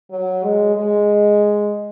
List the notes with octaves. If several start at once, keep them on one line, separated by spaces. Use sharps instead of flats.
F#3
G#3
G#3